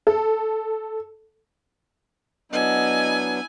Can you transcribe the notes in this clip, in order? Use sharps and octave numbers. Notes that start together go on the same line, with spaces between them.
A4
F#3 B3 D4 E4 D#5 G#5